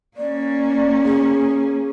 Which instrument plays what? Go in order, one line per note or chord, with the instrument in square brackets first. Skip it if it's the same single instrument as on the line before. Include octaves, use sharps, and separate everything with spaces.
[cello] A#3 C#4 [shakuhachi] D5
[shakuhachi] G#4